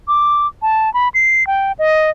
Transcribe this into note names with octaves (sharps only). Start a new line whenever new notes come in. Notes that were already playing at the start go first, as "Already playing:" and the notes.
D6
A5
B5
C7
G5
D#5